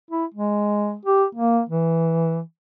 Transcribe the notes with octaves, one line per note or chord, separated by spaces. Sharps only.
E4
G#3
G4
A#3
E3